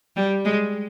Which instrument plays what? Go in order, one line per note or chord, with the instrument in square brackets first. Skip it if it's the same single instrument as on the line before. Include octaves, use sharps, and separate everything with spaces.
[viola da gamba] G3
G#3